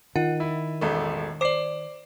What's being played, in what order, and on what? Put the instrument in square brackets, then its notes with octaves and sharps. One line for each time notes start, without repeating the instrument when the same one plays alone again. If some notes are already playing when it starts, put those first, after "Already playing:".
[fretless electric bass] D#3 [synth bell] F4 [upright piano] F#5
[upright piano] E4
E1 A1 A3
[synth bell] C5 D5 [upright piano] D6 C7